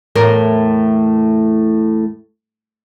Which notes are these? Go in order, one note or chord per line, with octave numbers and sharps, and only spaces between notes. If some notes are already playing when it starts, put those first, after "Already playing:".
E2 A2 A#4